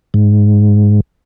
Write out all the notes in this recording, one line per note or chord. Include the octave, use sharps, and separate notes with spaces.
G#2